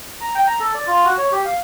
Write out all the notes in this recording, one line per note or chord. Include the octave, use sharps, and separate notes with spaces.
A#5
G5
A#5
A4
D5
F4
F#4
C#5
G4
F5